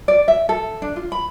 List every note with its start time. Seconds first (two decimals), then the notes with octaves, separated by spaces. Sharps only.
0.08 D5
0.28 E5
0.49 A4
0.82 D4
0.96 F4
1.12 B5